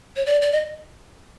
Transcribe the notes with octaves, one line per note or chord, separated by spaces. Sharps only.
C#5
D5
D5
D#5